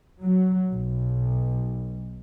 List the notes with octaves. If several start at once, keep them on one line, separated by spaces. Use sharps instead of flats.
F#3
B1